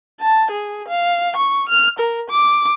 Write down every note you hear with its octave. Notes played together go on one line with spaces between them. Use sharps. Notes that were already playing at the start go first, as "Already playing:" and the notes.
A5
G#4
F5
C#6
F6
A#4
D6